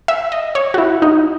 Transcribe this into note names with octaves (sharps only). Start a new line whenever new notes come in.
E5
D#5
C#5
F#4
E4
D#4